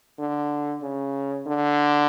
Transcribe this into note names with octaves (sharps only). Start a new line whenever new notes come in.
D3
C#3
D3